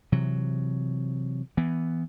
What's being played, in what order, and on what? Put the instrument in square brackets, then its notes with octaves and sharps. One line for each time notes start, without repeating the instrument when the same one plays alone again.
[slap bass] C3 E3 F#3
E3 B3